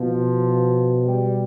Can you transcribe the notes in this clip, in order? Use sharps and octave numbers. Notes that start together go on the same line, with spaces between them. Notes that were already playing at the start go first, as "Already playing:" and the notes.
Already playing: B2 F3
G3